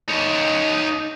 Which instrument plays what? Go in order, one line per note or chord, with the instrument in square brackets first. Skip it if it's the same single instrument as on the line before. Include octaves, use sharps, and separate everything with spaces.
[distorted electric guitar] D#4 C#5